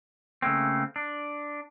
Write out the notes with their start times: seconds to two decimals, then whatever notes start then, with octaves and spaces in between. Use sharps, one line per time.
0.42 C#3 A3 A#3 C4
0.96 D4